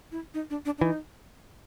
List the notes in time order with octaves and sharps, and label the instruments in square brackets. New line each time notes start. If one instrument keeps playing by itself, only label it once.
[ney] E4
D#4
D4
D4
D4
[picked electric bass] E3 [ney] D#4